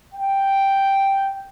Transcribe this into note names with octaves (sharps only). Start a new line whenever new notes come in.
G5